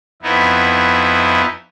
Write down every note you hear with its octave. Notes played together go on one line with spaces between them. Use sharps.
F2 B3 D#4 E4